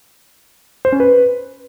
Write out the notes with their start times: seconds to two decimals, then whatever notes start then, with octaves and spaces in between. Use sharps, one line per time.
0.85 C5
0.92 C#4
1.00 B4